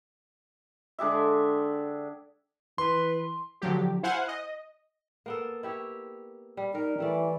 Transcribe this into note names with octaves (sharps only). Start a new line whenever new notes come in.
D3 G#3 G4 E5
E3 B4 C6
D3 F3 F#3 G4
E4 C5 F5 F#5 G#5
D#5
A#3 B3 A4
E4 G4 C#5
G3
G3 D#4 A#4
E3 G3 A3 D5